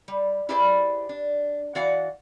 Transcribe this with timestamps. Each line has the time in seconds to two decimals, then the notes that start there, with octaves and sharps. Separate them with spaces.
0.08 G3
0.49 E4 G4 G#4 B4 C5 D5
1.09 D4
1.75 E3 F#4 D5 F5 F#5